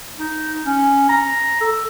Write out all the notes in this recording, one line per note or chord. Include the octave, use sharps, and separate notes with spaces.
D#4
C#4
A#5
A4